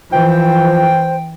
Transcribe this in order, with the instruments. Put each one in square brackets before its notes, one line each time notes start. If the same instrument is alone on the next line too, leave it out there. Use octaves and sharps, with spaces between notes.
[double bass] E3 [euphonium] F3 [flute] C5 [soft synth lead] G5